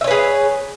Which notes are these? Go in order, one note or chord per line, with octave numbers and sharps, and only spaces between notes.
G#4 B4 C#5 E5